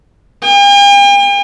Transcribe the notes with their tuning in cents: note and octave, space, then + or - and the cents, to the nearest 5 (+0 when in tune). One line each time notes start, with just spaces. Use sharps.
G5 +45